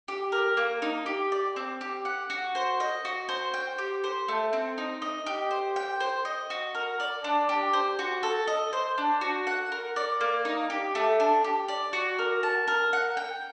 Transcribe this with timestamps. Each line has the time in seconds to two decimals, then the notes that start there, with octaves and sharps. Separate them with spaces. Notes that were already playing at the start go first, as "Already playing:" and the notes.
0.08 G4
0.32 A#4
0.57 A#3
0.82 D#4
1.06 G4
1.32 D5
1.56 C4
1.81 G4
2.05 F#5
2.30 F#4
2.55 C5
2.80 D#5
3.05 F#4
3.29 C5
3.54 G5
3.78 G4
4.04 C5
4.28 A3
4.53 C4
4.78 D#4
5.02 D#5
5.27 G4
5.51 C5
5.76 G5
6.00 C5
6.25 D#5
6.50 F#4
6.75 A#4
7.00 D5
7.24 D4
7.49 G4
7.73 C5
7.99 F#4
8.23 A4
8.47 D#5
8.73 C5
8.98 D4
9.21 F#4
9.47 F#5
9.72 A#4
9.96 D5
10.21 A#3
10.45 D#4
10.70 G4
10.95 A3
11.20 D4
11.44 G4
11.68 D5
11.93 F#4
12.18 A#4
12.43 A5
12.68 A#4
12.93 F#5
13.17 G5